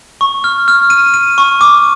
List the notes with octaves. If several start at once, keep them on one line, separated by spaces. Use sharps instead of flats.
C#6
F6
F6
D#7
D#7
C#6
D6